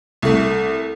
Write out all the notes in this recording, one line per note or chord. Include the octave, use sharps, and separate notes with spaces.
C2 A3